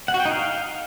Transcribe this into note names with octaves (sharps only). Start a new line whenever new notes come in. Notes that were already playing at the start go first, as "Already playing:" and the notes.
F#5
F#4
G5
D#4
F5